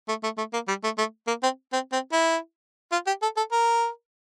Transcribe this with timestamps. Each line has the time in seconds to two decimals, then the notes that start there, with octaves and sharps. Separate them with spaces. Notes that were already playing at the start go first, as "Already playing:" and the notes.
0.08 A3
0.23 A3
0.38 A3
0.53 A#3
0.68 G3
0.84 A3
0.98 A3
1.27 A#3
1.43 C4
1.72 C4
1.92 C4
2.12 E4
2.92 F4
3.07 G4
3.22 A4
3.37 A4
3.52 A#4